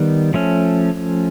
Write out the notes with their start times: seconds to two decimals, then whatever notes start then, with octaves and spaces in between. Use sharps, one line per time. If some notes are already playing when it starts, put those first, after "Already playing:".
Already playing: D#3 G3 B3
0.34 F3 A3 C#4